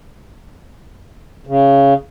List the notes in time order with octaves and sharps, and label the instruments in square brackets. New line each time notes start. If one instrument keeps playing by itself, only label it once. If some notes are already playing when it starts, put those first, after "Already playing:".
[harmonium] C#3